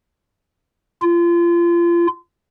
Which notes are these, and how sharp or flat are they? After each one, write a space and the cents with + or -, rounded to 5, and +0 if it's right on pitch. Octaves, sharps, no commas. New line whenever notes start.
F4 -30